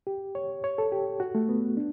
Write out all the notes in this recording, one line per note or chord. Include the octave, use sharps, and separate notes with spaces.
G4
C#5
C#5
A4
G4
F#4
A3
B3
D4